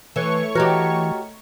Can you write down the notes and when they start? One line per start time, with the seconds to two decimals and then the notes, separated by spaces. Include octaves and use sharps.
0.16 E3 A3 C#5 C#6
0.55 E3 F#4 G4 D#5 A#5 F6